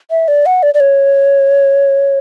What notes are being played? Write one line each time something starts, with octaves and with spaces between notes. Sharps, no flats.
E5
D5
F#5
D5
D5
C#5